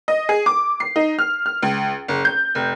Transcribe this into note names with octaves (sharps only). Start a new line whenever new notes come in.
D#5
G#4
D6
C7
D#4
F6
F6
C#2
F#1
G6
F1